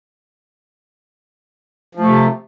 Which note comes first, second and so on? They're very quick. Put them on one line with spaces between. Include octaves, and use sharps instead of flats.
F3 A3 C3